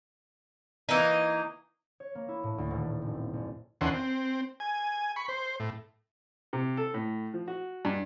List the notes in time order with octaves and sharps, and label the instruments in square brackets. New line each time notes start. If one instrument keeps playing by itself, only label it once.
[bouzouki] E3 A#3 D#4
[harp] C#5
A#3
E4
A2
D2
D#1
A3
F#1
C4
F#1
[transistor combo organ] D#2 D3 E3 C#4 F#5 C6
C4
G#5
B5 C#6
C5
A2
[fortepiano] C3
A4
A2
F3
F#4
G2